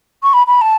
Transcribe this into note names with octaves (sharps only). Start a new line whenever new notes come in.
C#6
B5
B5
A5